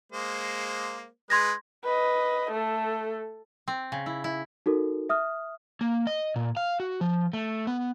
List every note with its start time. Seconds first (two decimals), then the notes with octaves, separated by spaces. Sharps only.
0.12 G#3 A#3 C5
1.30 G#3 B4 C6 G#6 A#6
1.84 B4 D#5
2.52 A3 A4
3.68 C4
3.92 C#3
4.06 E4
4.24 E4
4.66 D#4 F#4 A4 A#4
5.09 E5 D#6 F6
5.81 A#3
6.07 D#5
6.36 A#2
6.57 F5
6.80 F#4
7.01 F3
7.33 A3
7.67 B3